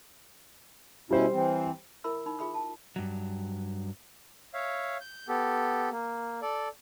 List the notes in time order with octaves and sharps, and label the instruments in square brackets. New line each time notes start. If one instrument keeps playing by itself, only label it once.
[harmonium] B2 C#4 E4 [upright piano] G3 C5
[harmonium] E3 C4
[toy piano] E4 A#4 E5 B5 E6
D#4 B5
F4 G#4 E5 B5 D#6
A5
[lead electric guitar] G2 F#3
[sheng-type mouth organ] C#5 E5 F5
G6
B3 G4 A4
A#3
A4 D5